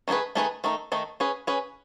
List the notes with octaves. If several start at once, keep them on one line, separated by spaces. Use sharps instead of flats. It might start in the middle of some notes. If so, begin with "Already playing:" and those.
D#3 A3 D#4 G#4 B4
D#3 A3 D#4 G#4 B4
D#3 A3 D#4
D#3 A3 D#4
C#4 G#4 B4
C#4 G#4 B4